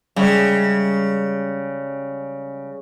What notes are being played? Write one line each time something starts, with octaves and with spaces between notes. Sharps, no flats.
C#3 G3 G#3 E5